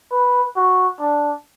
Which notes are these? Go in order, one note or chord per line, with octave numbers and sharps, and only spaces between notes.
B4
F#4
D4